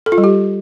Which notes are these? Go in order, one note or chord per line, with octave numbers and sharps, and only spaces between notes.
A4
F4
G3
G4